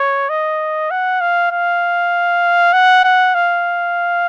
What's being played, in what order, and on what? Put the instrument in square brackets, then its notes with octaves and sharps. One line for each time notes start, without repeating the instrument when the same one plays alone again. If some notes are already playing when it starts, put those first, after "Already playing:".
Already playing: [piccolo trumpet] C#5
D#5
F#5
F5
F5
F#5
F#5
F5